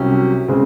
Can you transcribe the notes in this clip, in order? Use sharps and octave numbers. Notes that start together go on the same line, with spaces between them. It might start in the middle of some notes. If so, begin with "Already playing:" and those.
Already playing: C2 C3 F#3 C#4
C#3 G#3 C4